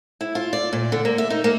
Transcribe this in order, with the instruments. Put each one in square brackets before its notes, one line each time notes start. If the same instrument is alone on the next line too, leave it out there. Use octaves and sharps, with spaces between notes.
[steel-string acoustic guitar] E4
F4
D5
A#2
D3
A#3
E5
D#4
A#3